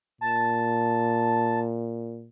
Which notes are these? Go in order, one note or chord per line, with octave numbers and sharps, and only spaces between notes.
A#2 A5